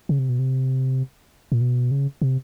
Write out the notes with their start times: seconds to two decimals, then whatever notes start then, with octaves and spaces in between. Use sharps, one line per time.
0.09 C#3
0.19 C3
0.29 B2
0.39 C3
1.52 A#2
1.61 B2
1.91 C#3
2.22 C3